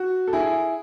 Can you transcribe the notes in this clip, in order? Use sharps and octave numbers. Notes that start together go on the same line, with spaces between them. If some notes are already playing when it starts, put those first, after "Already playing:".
Already playing: F#4
A4
E4 G#4